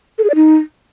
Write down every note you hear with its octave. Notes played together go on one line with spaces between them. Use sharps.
A4
G#4
D5
D#4